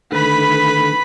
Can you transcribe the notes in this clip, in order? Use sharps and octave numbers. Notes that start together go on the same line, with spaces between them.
D3 D#3 A3 B4 B5